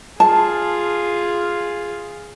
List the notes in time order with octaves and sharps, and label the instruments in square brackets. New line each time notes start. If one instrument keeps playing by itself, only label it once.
[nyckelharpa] F4 G#4 [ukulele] A5